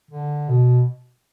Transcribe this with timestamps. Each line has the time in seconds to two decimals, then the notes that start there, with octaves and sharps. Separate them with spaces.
0.11 D3
0.48 B2